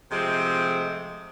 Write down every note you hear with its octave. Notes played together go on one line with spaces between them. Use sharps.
C3 F3 G#3 A3 C4